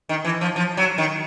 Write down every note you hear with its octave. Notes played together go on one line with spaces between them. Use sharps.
D#3
E3
F3
F3
F#3
D#3